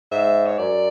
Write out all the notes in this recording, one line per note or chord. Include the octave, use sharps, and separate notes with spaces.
G#2 E5
C#5
F#2 D5